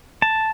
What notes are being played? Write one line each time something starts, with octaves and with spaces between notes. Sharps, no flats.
A5